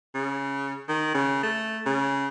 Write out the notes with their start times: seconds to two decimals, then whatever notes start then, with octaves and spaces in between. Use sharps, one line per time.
0.14 C#3
0.89 D#3
1.14 C#3
1.43 A3
1.86 C#3